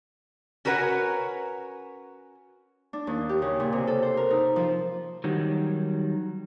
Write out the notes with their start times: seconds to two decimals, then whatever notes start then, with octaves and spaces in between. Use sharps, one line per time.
0.65 C#4 F#4 A#4 B4 C#5 F#5
2.93 D4
3.07 D#2
3.29 G4
3.42 C#3
3.60 A#2
3.72 C3
3.87 A4
4.03 C5
4.17 A#4
4.30 D#4
4.56 F3
5.24 D#3 F#3 G3